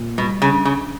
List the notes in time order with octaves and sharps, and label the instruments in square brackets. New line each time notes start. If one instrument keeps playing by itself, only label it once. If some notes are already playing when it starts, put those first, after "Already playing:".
Already playing: [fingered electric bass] A#2
[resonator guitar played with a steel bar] B2 [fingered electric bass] G3
[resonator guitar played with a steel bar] C#3
[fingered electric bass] C#4
[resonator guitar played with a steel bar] C#3